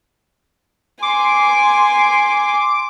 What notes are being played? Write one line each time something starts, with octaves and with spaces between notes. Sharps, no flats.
G#5 C6 D6